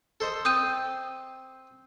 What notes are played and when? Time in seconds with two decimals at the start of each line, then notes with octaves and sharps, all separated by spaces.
0.20 A4 C5 D#5
0.45 C4 D#6 G6 D#7